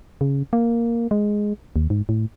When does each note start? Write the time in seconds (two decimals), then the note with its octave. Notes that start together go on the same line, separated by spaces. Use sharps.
0.21 C#3
0.53 A#3
1.11 G#3
1.76 D#2
1.90 G#2
2.09 A2